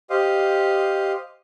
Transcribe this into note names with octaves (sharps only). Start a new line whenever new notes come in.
G4 C5 D#5 F5